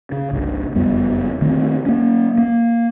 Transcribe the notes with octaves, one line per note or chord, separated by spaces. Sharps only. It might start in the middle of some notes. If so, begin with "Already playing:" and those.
C#3
G1 C2
F#1 F2 G3 B3
D3 D#3 A3 C4
A#3 C#4
A#3